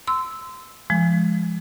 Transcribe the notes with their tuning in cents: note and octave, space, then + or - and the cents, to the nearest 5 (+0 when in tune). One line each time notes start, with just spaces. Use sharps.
C6 -25 E6 -5
F3 -25 G#3 +0